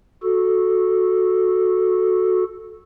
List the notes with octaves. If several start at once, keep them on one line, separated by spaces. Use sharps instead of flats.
F#4 A4